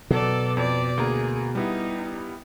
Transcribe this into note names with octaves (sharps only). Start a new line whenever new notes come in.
B2 F#3 A4 D5
F2 D5
D2 A#3 G#4 A#5
G3 B3 D#4 E4